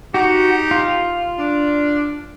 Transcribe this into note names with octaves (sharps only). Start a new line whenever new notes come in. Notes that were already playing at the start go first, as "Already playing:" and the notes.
D#4 F#4 G4
F4
D4